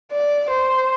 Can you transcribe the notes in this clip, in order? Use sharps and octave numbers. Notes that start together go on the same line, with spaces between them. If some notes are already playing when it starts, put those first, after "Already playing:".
D5
C5